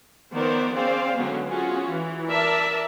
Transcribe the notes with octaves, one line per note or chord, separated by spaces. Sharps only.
D#3 F3 B3 A#4 C5 D5
C4 C#4 G#4 C5 D5 F5
D3 F#3 G#3 B3 C#4
C#4 F4 F#4 G#4
E3
A#4 D5 E5 A5